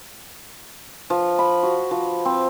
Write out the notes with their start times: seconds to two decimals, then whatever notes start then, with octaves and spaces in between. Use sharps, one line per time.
1.10 F3
1.39 B5
1.63 F#4
1.91 F3
2.25 C4